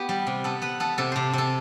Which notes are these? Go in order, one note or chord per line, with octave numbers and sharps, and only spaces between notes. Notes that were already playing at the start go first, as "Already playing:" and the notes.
Already playing: B3 G4
G3
C3
B3 A4
B3 B4
B3 A4
C3 A4
C3 C5
C3 A4